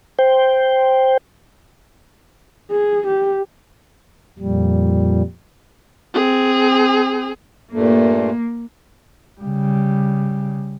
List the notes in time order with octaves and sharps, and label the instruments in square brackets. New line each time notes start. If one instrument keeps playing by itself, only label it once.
[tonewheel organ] C5 G5
[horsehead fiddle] G#4
G4
[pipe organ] F2 A#2 G3
[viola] C4 G#4
[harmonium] G2 A#2 A3 [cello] A#3
[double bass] C#3 G3